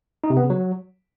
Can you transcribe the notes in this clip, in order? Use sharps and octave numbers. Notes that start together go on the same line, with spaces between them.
D#4
C3
B3
C#3
F#3